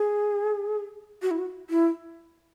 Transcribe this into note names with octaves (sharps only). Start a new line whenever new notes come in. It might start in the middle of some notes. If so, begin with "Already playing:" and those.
Already playing: G#4
F#4
E4
F#4
E4